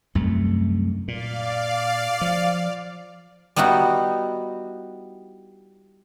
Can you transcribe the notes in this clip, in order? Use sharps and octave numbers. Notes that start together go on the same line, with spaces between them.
C2 F#2 A3
A#2 D5 F5
F3
G3 B3 D#4 E4 F#4